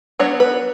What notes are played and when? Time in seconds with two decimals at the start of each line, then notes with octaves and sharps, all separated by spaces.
0.19 F#3 B3 D4 C#5
0.40 B4